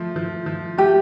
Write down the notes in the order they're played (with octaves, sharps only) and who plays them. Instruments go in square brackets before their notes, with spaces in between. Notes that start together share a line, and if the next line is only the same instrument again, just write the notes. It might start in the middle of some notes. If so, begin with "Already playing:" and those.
Already playing: [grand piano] F3 A3
F3
F3
[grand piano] A3 [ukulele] G4